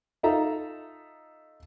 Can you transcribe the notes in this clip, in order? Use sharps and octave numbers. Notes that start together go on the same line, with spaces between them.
D#4 F4 A4 E5 A#5